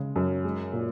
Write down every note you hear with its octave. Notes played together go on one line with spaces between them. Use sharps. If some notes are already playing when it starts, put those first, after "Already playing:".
Already playing: C#3 G#3
F#2
G#3
A#2